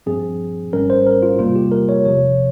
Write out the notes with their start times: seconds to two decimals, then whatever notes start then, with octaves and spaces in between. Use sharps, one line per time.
0.06 G2 F3 C4 G#4
0.73 G#1 G#2 G3 C#4 A#4
0.90 C5
1.07 A#4
1.23 F4
1.39 E2 C3 G3 A#3 F4
1.56 G4
1.71 A#4
1.89 C#5
2.05 E2 C3 F3 C#5